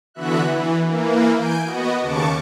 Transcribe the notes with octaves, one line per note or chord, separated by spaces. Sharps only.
D3 E3 B3 F#4 E5 F#6
E3
E3 A#3
G#5 G6 D7
B3 F#4 D#5
D#2 C#3 A5 C#6 D6